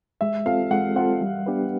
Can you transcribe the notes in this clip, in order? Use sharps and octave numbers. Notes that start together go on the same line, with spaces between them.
G#3 E5
C4 F4 A4 F5
G#3 F#5
C4 F4 A4 F#5
G3
B3 D4 G4 B4